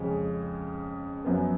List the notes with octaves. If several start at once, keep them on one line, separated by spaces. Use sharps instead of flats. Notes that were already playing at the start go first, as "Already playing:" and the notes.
Already playing: F2 C#3 G#3
F#2 F3 B3